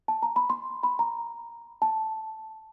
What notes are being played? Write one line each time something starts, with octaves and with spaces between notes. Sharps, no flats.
A5
A#5
B5
C6
B5
A#5
A5